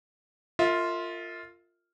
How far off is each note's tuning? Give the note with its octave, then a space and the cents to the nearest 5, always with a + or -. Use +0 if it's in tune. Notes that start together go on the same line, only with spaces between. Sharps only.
F4 +0 A#4 -35 E5 -35